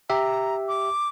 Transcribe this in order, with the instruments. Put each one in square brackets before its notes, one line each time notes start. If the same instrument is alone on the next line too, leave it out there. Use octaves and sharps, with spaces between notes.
[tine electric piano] G4 E5 [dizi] A#5
[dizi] D6